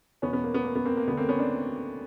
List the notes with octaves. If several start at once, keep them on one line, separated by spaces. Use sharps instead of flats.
E2 B2 B3 C#4
B3
A#3
B3
A#3
B3
A#3 C4
A#3
D2 D3 B3
A#3 C4
B3 C#4
C4 D4